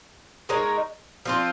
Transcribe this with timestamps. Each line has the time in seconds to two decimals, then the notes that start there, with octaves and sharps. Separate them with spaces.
0.49 G#3 D#4 A#4 C#5
1.25 F3 C4 F4